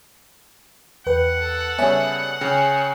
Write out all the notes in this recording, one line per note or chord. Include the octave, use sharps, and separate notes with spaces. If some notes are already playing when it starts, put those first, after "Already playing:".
E2 B4 F#5 G5
A4
C#3 G3 B3 C#5 E5 G#5
C#3 C#4 G#4 G5 F6